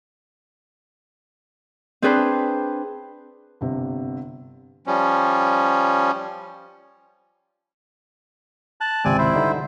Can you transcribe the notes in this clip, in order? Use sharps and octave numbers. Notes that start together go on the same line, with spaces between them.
C4 D4 G#4 B4 C5
G1 C3
F3 G3 C#4
A5 F#6
G#1 C#2 C3 C4 D5 G#5
E4 C5
D3 G3 D#4